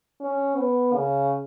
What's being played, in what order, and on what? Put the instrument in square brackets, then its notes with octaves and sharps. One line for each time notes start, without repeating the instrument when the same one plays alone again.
[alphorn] C#4
B3
C#3